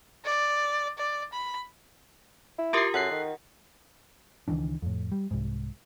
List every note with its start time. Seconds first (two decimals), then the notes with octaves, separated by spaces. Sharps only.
0.25 D5
0.98 D5
1.33 B5
2.59 E4
2.73 F4 G4 A#4 D6 A6 C7
2.94 F#2 A4 F#5 F#6 C7
3.12 D#3
4.48 C#2 D#3 E3 D4
4.82 F2 A2
5.12 G3
5.31 C2 G#2